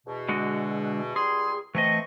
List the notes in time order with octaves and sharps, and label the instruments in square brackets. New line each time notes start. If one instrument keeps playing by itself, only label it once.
[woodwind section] E2 B2
[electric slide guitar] D3 G#3 F#4
[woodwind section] C#2 G3 C6 [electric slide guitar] G#4
[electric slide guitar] E3 A3 D#5 [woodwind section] C4 C#6